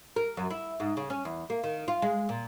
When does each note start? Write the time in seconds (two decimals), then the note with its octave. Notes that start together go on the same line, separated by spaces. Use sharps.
0.16 A#4
0.37 F#2
0.50 E4
0.80 G#2
0.97 C#3
1.10 C#4
1.25 E2
1.50 A#3
1.64 D#3
1.88 F4
2.02 G#3
2.29 A#2